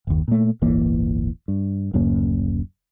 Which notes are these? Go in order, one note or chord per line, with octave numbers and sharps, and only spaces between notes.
F#1 D#2
A#2 A3
D1 G1 E3 A#3
G2
D1 F#2 C#3 A#3